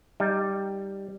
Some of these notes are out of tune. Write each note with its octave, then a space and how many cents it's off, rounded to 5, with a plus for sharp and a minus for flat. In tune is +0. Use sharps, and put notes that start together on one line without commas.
G3 +0 D#4 +0